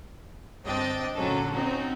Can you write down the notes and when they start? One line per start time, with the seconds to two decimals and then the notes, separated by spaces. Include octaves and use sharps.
0.64 G1 C4 D4 D#5 G5 A6
1.16 A#2 D3 F#3 A#3 C#4 A4
1.53 C4 C#4 D#4 F#4